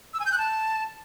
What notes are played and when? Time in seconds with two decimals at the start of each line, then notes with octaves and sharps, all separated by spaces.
0.14 E6
0.20 G#5
0.26 G6
0.32 F#6
0.38 A5